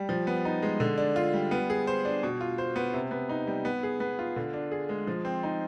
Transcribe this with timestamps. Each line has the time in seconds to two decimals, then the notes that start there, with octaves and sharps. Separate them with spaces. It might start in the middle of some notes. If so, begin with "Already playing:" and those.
Already playing: G3
0.09 F3
0.27 B3
0.45 D#4
0.63 G#3
0.80 D3
0.98 D4
1.16 F4
1.34 G3
1.51 B3
1.70 G#4
1.87 C5
2.05 D4
2.23 B2
2.41 F4
2.58 C5
2.76 B3
2.94 C3
3.11 B3
3.29 D#4
3.47 G3
3.65 B3
3.83 G#4
4.00 B3
4.19 F4
4.36 D3
4.54 D4
4.72 G#4
4.89 G#3
5.07 F3
5.25 C4
5.43 D#4